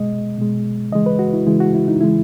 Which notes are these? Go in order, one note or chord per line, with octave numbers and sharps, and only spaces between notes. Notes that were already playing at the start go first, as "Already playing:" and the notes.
Already playing: B2 G#3 D#5
B2 G#3
C#3 E3 G#3 D#5
B4
F#4
E4
C#3 E3 G#3 E4
F#4
E4
D#4
C#3 E3 G#3 E4